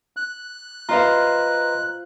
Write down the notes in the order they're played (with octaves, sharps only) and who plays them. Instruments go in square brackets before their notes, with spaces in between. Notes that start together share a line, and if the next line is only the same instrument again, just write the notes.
[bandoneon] F#6
[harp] F4 C5 F5 [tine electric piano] B4 D#5 A#5